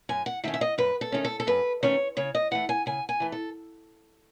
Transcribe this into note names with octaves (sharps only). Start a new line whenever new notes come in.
F#2 G#5
F#5
D#3 A3 C#4 E5
E5
D#5
F#2 B4
A4
D#3 A3 C#4
A4
A4
F#2 B4
D#3 A3 C#4 C#5
C#3 C#5
D#5
E3 A3 F#5
G#5
C#3 G#5
G#5
E3 A3
A4